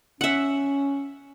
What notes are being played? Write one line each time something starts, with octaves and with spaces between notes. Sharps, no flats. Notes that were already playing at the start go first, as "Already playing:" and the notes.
C#4 E5 F#5